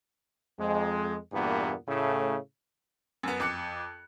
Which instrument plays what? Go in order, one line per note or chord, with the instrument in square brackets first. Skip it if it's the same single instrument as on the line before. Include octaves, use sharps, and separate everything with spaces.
[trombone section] F2 G#3
E2 G2 A#2 E3 A#3 B3
A2 C#3 A3
[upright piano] F#2 B3
F2 D6 F#6 C#7